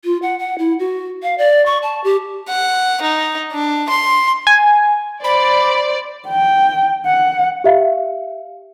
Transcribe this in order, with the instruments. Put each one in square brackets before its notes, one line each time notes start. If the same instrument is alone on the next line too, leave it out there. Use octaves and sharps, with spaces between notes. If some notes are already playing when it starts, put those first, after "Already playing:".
[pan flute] F4
F#5
F#5
E4
F#4
F5
D5
C#6
A5
G4
[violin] F#5
D#4
D4
C6
[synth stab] G#5
[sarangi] C5 [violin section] D5 [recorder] B5
[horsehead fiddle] G5
F#5
[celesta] G4 E5 F5